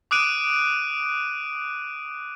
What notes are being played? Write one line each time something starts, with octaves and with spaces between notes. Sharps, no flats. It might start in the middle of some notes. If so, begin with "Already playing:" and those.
D6 D#6 F#6 D7 D#7